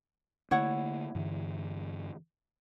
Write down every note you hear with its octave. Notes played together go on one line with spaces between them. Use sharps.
D3 A3 A#3 E4 C#5 F#5
G2 D3 E3